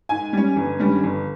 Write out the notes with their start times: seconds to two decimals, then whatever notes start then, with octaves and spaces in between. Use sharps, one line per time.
0.09 G#2 G#5
0.33 G3 C#4
0.56 G1
0.79 G2 D#3 G3 C#4
1.03 G1